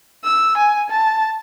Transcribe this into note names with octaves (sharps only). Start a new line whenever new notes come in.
E6
G#5
A5